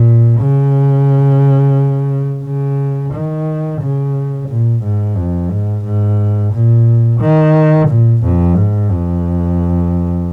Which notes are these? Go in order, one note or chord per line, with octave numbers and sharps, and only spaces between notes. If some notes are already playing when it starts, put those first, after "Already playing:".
Already playing: A#2
C#3
C#3
D#3
C#3
A#2
G#2
F2
G#2
G#2
A#2
D#3
A#2
F2
G#2
F2